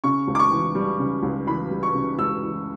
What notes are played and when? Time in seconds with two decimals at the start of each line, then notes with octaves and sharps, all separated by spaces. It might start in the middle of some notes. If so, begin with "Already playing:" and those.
0.04 C#3 C#6
0.28 C#2
0.35 D6
0.39 C#6
0.52 E3
0.75 G3
0.99 C#3
1.23 C#2
1.47 E3 B5
1.71 G3
1.83 C#6
1.95 C#3
2.18 C#2 E6
2.43 E3